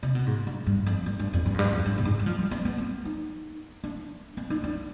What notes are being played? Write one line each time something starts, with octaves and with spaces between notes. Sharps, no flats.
C3
B2
G#2
G2
G2
F2
G2
G2
F2
G2
F2
G2
F2
G2
B2
G#2
G3
F3
G3
C4
B3
C4
D#4
D4
C4
D#4
D4